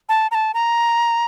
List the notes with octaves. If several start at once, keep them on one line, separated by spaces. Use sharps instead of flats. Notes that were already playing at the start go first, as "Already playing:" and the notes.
A5
A#5
A5
A#5